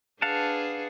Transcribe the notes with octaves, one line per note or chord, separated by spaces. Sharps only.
D4 G#4 B4 F5 F#5 A5